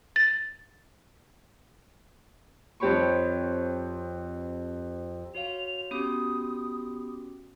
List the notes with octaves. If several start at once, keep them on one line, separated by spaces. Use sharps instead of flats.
A6
F2 C4 G4 C#5 B5 C#6
F#4 C#5 F5 F7
B3 C#4 F#4 G4 D6 D#6